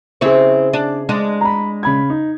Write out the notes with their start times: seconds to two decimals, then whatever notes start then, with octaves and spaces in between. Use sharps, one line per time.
0.21 C#3 C4 E4 G#4 C#5
0.73 D4
1.09 G#3 D4
1.41 A#5 B5
1.83 C#3 B5 G#6
2.10 D#4